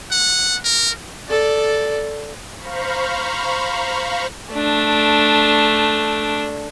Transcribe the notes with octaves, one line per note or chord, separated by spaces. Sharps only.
F#5
A#4
A4 D5
C5 F5 A#5 B5 C#6
A3 D4